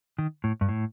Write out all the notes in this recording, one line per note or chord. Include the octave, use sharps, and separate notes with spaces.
D#3
A2
G2
A2